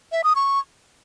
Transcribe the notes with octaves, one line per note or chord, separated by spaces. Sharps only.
E5
D#6
C#6